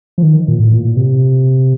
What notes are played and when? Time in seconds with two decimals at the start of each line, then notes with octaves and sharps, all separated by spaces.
0.18 F3
0.23 D#3
0.48 A#2
0.59 A2
0.72 A#2
0.96 C3